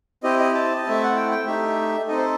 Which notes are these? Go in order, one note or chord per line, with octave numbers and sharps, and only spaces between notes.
C4 E4 G4 D#5
D#5
A5
D#5
A3 C4 E4 E5
F#5
G5
G5
A3 D#4 G4 E5
C4 D#4 A4 D#5
C5